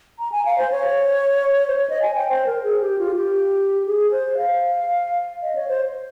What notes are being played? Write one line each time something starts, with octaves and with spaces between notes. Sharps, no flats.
A#5
G#5
F5
C5
C#5
C5
C#5
D#5
G#5
G5
C5
A#4
G#4
G4
F4
G4
G#4
C5
F5
D#5
C#5
C5